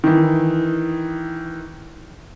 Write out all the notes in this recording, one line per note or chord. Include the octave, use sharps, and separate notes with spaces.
D#3 E3